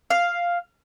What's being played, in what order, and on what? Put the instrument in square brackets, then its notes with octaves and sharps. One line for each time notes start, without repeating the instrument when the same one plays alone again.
[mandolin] F5